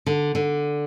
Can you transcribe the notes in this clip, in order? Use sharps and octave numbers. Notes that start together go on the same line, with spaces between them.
D3
D3